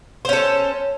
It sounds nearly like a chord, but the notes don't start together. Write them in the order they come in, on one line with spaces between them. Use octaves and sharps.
C5 C#4 A4